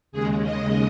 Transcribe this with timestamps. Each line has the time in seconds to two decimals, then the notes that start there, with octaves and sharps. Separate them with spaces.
0.12 D#2 C#3 G#3 G#4
0.43 D#5